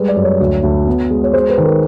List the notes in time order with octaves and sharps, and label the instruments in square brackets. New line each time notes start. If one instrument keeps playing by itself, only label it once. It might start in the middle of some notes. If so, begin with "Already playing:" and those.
Already playing: [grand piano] G3 G#3 B4
D5
F#2
C#5
D2
D2
B3
G#3
C#5
G#3 C5
B4
D#3
A#4